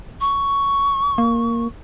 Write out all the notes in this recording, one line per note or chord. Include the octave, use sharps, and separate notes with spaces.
C#6
A#3